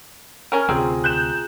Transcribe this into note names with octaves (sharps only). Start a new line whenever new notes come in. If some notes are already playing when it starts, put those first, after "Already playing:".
C#4 A#4
D2 C3 C4 F4 G#4 A#5
F#6 G6 E7